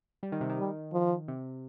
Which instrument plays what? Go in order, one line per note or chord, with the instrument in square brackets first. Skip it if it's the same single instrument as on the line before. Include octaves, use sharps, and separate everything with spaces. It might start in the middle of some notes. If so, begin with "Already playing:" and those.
[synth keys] G3
D#3
C3
D#3
[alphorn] G3
F3
[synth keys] C3